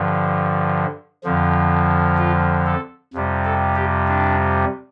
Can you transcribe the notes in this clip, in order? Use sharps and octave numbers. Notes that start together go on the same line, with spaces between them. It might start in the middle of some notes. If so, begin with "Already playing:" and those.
Already playing: G2 D3 F3
F2 D3 F3
F4
A4
F2 C3 G3
A4
G4
D4